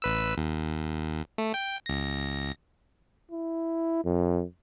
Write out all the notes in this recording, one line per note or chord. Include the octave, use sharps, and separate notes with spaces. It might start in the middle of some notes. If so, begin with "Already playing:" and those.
A1 B4 E6
D#2
A3
G5
C#2 A#6
E4
F2